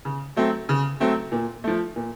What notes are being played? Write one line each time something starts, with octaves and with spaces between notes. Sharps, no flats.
C#3
F#3 A3 C4
C#3
F#3 A3 C4
A#2
F3 A3
A#2